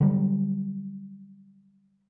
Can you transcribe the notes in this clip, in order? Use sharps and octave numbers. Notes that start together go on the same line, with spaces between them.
D3 F#3 G3